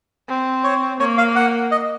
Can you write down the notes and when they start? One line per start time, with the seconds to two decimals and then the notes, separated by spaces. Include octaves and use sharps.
0.28 C4
0.64 C#5
1.00 A#3 C#5
1.18 F5
1.36 F#5
1.71 D#5